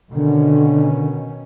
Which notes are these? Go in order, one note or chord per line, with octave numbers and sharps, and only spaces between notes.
B2 D3 D#3 C#4